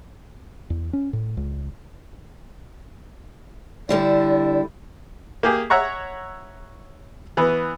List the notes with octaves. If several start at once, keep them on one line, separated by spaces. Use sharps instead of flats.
E2
C#4
A2
C#2
D3 G3 E4 D5
A#3 G4 G#4
C#5 E5 F#5 A#5 C#6
E3 B3